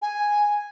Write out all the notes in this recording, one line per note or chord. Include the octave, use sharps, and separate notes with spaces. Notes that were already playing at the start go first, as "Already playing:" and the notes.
G#5